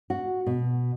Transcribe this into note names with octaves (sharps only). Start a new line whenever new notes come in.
F#4
B2